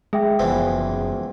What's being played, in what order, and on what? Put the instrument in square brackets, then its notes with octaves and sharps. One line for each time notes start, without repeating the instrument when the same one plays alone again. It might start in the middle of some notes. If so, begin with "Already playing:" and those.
[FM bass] G#3 [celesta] G#4 E5 G5
[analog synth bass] F#1 [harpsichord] E2 E3 F3